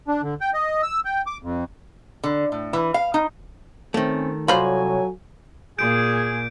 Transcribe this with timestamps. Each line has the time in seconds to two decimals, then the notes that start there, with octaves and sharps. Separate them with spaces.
0.08 D4
0.22 D3
0.41 G5
0.54 D#5
0.83 E6
1.05 G5
1.27 D6
1.43 F2
2.24 D3
2.52 A2
2.73 E3
2.94 F5
3.14 D#4
3.94 D#3 A3 C4 C#4
4.48 C2 F#3 F4 A4 C5 C#5 G#5 B5
5.78 A#2 G#4 G#5 G6 D7